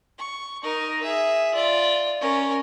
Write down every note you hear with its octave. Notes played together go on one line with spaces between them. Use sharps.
C#6
D#4 A#4
G#4 E5
F4 D5
C#4 A#4